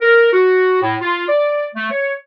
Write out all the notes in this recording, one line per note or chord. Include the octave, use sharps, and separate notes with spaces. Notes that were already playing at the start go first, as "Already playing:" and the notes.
A#4
F#4
A2
F4
D5
A3
C#5